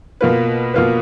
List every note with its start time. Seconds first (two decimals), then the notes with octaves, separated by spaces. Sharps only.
0.21 B2 A#3 F4 B4
0.74 B2 A#3 F4 B4